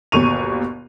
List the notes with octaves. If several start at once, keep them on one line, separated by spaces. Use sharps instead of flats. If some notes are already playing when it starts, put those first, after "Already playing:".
G1 D#2 B2 C#6 D#7 F7